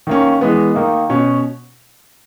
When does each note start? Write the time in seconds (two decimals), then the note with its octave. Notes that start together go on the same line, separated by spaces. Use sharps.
0.07 D#3 A#3 C#4
0.41 E3 G#3 B3
0.75 D#3 A#3 D#4
1.09 B2 C#4